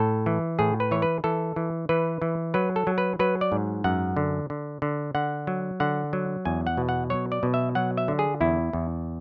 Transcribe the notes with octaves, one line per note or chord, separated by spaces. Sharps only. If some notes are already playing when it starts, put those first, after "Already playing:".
Already playing: A2 A4
E3
A2 G#4
B4
E3 C#5
B4
E3 A4
E3
E3 B4
E3
F#3 B4
A4
F#3
B4
F#3 B4
D5
G#2
F#2 F#5
D3
D3
D3
D3 F#5
F#3
D3 F#5
F#3
E2 G#5
F#5
B2
F#5
F#3 C#5
D5
B2
E5
F#3 F#5
E5
D3
G#4
E2 E4
E2